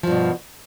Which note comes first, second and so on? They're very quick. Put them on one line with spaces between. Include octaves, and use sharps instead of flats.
F3 G2 B2